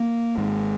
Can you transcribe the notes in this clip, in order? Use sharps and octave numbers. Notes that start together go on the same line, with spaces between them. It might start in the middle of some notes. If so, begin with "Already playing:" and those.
Already playing: A#3
G#1 G#2